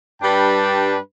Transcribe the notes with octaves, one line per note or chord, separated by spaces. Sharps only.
G2 G3 D4 B4 G5 A5